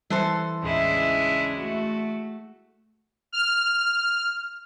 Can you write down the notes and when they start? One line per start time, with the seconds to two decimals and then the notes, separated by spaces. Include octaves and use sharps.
0.10 E3 G3 A4 C5
0.63 A1 D#2 A2 C#3 G#3 D4 E4
1.58 A3 F#4
3.32 F6